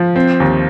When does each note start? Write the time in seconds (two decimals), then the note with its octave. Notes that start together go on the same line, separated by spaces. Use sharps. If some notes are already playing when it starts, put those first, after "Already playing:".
Already playing: F3
0.16 C4
0.40 D#2